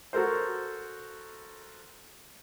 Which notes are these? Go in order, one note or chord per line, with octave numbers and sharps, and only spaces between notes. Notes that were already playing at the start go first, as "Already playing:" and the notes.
F#4 A4 A#4 C5